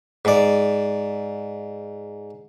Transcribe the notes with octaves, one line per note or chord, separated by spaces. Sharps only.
G#2 D5